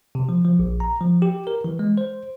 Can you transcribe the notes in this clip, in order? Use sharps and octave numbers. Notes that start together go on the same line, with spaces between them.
C3
F3
F3
A#1
A#5
F3
G4
A#4
E3
G#3
C5